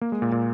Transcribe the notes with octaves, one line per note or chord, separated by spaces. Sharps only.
A#3
G#3
A#2
A#2